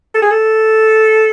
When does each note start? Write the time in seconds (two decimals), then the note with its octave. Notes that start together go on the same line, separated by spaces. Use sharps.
0.14 A4
0.22 G#4
0.31 A4